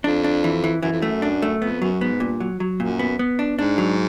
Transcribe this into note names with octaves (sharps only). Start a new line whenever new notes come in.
F2 D4
D4
E3
E3
F#2 E3
F2
F#2 A3
D4
A3
F2 B3
F#2 F#3
G#2 B3
G2 A#2
F#3
F#3
F#2 A#2
B3
B3
D4
G#2 D4
F#3